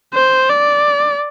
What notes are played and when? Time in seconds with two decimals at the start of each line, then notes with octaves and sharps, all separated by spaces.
0.14 C5
0.49 D5